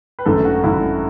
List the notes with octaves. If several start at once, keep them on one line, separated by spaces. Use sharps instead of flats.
B4
G#1 F#2 D3 A3 A4
F#4
G#1 F#2 D3 A3 E4